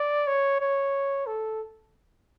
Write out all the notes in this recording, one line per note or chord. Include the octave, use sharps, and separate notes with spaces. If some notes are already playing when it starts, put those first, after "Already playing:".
Already playing: D5
C#5
C#5
A4